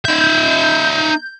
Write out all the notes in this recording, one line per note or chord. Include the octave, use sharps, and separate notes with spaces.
D#4 E5 G6